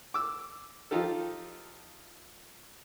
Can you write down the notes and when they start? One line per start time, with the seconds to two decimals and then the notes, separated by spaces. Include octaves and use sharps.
0.14 D6 E6
0.91 F3 D#4 F4 G4 A4